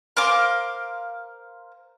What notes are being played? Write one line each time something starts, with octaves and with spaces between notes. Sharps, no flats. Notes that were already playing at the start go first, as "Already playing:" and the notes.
A#4 C5 F5 D6